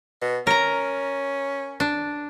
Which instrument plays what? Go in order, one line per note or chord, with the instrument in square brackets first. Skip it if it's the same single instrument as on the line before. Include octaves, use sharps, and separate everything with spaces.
[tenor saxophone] B2
[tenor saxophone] C#4 [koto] A#4 A#5
[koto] D4